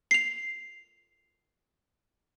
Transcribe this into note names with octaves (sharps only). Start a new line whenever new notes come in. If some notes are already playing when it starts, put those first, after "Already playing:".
C7 F7